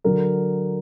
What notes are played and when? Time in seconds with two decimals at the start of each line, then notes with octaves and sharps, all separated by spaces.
0.04 D3 F#3 A#4